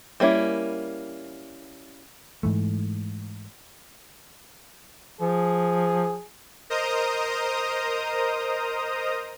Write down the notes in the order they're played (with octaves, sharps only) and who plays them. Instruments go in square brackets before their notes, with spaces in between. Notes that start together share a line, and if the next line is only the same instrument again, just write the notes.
[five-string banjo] G3 A#3 C#4 E4
[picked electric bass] G#2 E3 A3
[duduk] F3 [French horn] G#4
[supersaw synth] A#4 C5 D#5 A#5 D#6